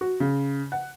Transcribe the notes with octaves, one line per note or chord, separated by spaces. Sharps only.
F#4
C#3
F#5